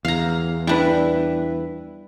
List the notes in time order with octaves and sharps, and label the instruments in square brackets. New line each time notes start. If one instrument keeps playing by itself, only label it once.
[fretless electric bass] E2 [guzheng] F5 A#5
[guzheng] G3 D4 [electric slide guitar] E4 B4